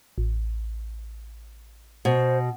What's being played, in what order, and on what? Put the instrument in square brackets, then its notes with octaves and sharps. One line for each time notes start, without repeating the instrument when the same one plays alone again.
[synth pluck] A1
[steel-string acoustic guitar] B2 [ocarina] C5